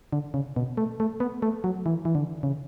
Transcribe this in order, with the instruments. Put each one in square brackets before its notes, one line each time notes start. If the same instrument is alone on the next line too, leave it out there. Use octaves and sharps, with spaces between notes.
[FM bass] D3
C#3
B2
A3
A3
B3
A3
F#3
E3
E3
D3
C#3